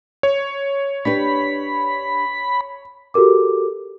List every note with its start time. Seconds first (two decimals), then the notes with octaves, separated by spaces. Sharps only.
0.23 C#5
1.05 D4 G4 B4 B5
3.14 F#4 G4 A4 A#4 D6